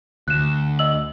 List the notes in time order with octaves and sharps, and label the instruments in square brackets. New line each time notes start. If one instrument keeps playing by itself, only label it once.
[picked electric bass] D2 [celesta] F#6 E7
[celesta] D#5 E6 F#7